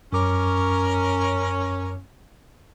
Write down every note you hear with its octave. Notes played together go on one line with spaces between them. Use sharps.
F#2 C#4 A#4 D6